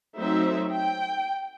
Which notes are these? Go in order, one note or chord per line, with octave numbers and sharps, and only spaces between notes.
F#3 A3 C4 D#4 C5 E5
G5